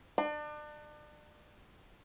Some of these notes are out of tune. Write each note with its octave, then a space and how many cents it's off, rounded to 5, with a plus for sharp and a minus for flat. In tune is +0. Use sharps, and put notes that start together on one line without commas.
D4 +35